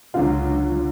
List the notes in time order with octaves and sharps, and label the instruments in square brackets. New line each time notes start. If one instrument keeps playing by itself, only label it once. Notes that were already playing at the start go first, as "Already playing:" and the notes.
[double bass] C#2 F#3 [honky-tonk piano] D3 F4